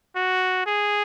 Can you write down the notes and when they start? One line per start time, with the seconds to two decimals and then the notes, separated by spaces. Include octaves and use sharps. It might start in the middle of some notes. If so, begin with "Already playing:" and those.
0.16 F#4
0.66 G#4